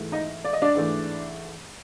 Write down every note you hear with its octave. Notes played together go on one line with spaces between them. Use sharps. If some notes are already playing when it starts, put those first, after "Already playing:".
Already playing: G#2 E3 A3
D#4 D#5
D5
D#5
D4 D5
G#2 E3 A3